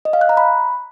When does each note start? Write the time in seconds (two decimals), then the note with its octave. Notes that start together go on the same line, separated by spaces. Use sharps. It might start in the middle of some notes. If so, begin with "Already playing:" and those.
0.05 D#5
0.13 F5
0.21 F#6
0.29 A#5
0.37 B5